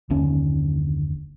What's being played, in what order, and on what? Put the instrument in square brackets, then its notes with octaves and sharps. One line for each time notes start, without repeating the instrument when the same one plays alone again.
[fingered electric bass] F#1 D#2 D3 C#4